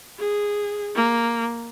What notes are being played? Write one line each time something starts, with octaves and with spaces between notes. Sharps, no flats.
G#4
A#3